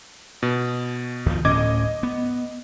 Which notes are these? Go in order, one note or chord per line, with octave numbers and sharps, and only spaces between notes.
B2
D2 F3
D1 A2 C#4 D#5 D6 G#6
B3